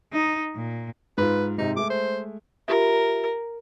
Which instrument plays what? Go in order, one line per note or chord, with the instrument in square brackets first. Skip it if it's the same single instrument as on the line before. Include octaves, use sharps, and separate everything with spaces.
[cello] D#4
A#2
[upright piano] G#2 F4 [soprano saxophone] B4
[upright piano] G#2 C3 [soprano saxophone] D#4
[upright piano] G#3 A3 [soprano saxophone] D6
[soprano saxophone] C5
[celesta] F4 G4 E5 [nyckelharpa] A#4